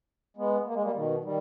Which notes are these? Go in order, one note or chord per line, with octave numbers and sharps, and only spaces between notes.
G#3 B3
A#3
G#3
G3 A#3
B2 D#3
D#3 G3